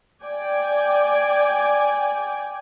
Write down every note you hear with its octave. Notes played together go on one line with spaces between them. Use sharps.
D5 G5 G#5